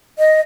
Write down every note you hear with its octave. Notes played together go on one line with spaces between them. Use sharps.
D#5